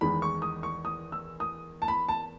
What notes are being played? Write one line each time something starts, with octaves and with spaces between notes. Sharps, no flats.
E2 D#3 G#3 B5
C#6
D#6
C#6
D#6
E6
D#6
A5
B5
A5